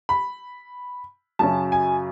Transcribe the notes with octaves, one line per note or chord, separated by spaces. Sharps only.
B5
F#2 C#3 F#3 C#4 A5
G#5